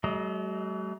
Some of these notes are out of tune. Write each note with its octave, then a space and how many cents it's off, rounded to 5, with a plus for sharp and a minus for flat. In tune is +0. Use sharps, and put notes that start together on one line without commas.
F#3 +45 A3 -40 D#5 +0